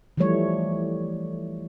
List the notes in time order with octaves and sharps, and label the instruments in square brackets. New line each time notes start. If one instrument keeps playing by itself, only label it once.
[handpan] E3 F3 G3 A3 C#5